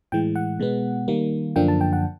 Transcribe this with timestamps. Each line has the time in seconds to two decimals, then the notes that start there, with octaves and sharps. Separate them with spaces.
0.12 A2 E3 G#3 G5
0.36 F#5
0.59 B2 G#3 B3
1.08 D#3 G3 A#3
1.56 F#2 D3 F3 A#3 D4 G5
1.68 A5
1.81 G5
1.93 F#5